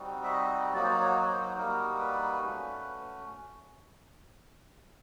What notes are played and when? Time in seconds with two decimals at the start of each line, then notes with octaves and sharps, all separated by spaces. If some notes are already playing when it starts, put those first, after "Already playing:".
Already playing: G3 C4 D#4 F#4
0.24 E5
0.32 D#5
0.74 F#3 A#3 D#4 F#4 D5
0.83 C5
0.88 C#5
1.02 C#5
1.15 C#5
1.30 C5
1.43 C5
1.57 G3 A#3 D#4 F#4 A#4
1.99 B4
2.41 A3 C#4 F#4